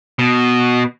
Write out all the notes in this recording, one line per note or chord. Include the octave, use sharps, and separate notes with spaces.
B2